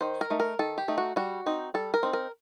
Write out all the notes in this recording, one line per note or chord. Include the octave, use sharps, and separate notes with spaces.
D#3 C5
A#4
A3 D#4
A#4
D#3 A4
G4
A3 D#4
F#4
G3 F#4
C4 D#4
G3 A4
A#4
C4 D#4
A#4